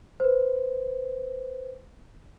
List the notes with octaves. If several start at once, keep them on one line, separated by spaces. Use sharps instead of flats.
B4 C5